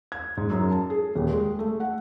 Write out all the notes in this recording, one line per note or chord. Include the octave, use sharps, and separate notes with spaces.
G#6
G#2
F#2
A5
G#4
D#1
G#3
A3
F#5